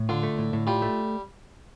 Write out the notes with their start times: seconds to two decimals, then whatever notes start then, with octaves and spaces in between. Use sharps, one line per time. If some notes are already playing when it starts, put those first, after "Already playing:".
Already playing: A2
0.09 D3 F4
0.23 A3
0.38 A2
0.53 A2
0.67 G3 F4
0.82 A3